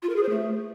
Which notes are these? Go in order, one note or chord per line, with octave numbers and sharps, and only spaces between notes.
F4
A#4
G#4
C5
A3